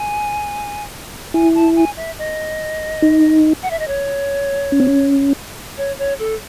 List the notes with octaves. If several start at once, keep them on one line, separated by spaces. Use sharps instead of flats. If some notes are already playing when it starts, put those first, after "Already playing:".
Already playing: G#5
E4 G#5
A5
G#5
E5
D#5
D#4
F#5
E5
D#5
C#5
C#4
C4
C#4
C#5
C#5
A4